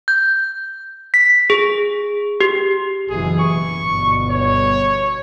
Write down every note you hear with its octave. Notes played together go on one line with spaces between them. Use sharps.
G6
B6
G#4
G4
F#1 B2 E3 G#4
C#6
G1 B2
C#5